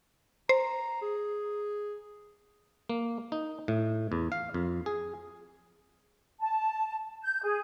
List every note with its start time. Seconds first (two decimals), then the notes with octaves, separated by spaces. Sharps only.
0.49 C5 A#5
1.02 G#4
2.90 A#3
3.32 D#4
3.68 A2
4.12 E2
4.32 F5
4.54 F2
4.86 G#4
6.41 A5
7.23 G6
7.44 G#4